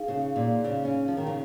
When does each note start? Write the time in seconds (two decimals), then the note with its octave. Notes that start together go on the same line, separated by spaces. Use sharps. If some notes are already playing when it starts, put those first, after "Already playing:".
Already playing: D#4 G#4 F5
0.08 C#3
0.36 A#2
0.64 C#3
0.85 C#4
1.08 F3
1.17 D#3
1.27 C#3